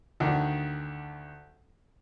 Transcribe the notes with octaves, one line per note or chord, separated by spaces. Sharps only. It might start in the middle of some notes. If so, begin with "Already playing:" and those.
D2 D3 D#3 D4